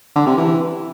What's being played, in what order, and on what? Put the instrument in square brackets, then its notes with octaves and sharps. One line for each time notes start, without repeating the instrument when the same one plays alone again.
[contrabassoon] D3
C3
E3